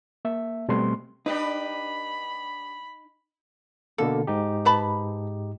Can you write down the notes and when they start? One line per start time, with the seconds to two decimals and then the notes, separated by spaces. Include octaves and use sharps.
0.25 A#3 E5
0.69 B2 G3 A3 C4 C6
1.26 D4 D#4 G4 B4 B5
3.98 B2 D3 A#3 A4
4.27 G#2 D#4 G4
4.65 B4 A5 B5